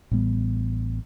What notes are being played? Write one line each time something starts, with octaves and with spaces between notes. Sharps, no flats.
A1 A2 G3 B3